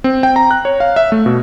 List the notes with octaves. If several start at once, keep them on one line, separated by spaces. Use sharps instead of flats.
C4
G5
A#5
F#6
C#5
F5
E5
A3
B2